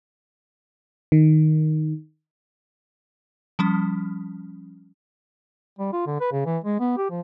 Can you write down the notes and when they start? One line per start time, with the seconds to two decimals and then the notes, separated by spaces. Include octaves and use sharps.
1.12 D#3
3.59 F3 G3 C#4
5.79 G3
5.93 F4
6.07 D3
6.20 B4
6.32 C#3
6.46 E3
6.64 G#3
6.80 B3
6.97 G4
7.11 F3